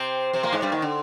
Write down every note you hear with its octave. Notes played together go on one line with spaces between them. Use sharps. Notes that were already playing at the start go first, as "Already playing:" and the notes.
Already playing: C3 C4
C3 C4
A#2 A#3
G#2 G#3
G2 G3
D#2 D#3
D3